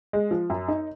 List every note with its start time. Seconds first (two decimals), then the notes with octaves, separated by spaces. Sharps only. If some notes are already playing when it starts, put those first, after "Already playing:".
0.13 G#3
0.31 F3
0.50 F#2
0.68 D#4